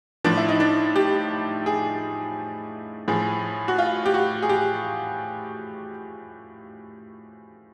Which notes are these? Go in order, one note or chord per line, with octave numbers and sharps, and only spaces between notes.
A2 F3 D4
E4
D#4
D4
G4
G#4
A2 F3 G#4
F#4
F4
G4
F#4
G#4
G4